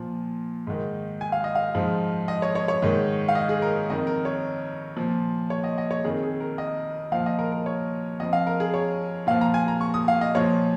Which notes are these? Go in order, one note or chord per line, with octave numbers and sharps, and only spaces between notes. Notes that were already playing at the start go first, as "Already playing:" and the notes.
Already playing: A#2 F3
G#2 D#3
G#5
F5
D#5
F5
G#2 F3
D#5
C#5
C#5
C#5
G#2 D#3
F5
D#5
G#4
A#4
F2 D#3 D#5
A#4
C#5
A#2 F3
C#5
D#5
D#5
C#5
F2 D#3 G#4
G#4
A#4
D#5
A#2 F3 F5
D#5
A#4
A#4
C#5
F2 F3 D#5
F5
A#4
G#4
C#5
A#2 F3 F5
A#5
G#5
A#5
C#6
D#6
F5
D#5
A#2 F3 C#5